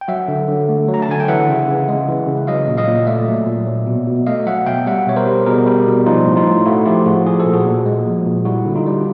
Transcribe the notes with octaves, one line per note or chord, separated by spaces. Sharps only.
G5
F#3 E5 F#5
D3
D3
A3
F#3
A#5
A5
D3 G#5
G5
E3 E5 F#5
C#3
C#3
G#3
E3
C#3
F#3 D#5 F5
A#2
D#5 F5
A#2
A3 D5 E5
F#3
A#2
F#3
B2
B2
A3 D#5 F5
F#3 E5 F#5
B2 F5 G5
G3 E5 F#5
B2 C#5
A#4 C5
G3
B2 G#4 A#4
G3
B2
F3 D#4 F4
A2
D#4 F4
A2
A3 E4 F#4
F3 F4 G4
A2 F#4 G#4
F3 G#4
A4
A#2
F#4 G#4
A#2
G#3
F3
A#2
G3 E4 F#4
D3
D#4 F4
G3